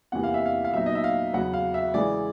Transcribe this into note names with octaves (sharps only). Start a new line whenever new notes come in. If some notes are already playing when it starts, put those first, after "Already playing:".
E2 C3 E3 G3 A#3 F#5
F5
E5
F5
F5
A#2 F#3 B3 D#4 E5
D#5
E5
F5
E2 C#3 F#3 F#5
F5
E5
C#3 E3 G#3 D5